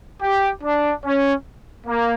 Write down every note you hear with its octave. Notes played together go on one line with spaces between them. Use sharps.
G4
D4
C#4
A#3